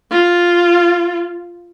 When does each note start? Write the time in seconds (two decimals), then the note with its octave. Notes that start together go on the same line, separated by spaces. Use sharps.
0.11 F4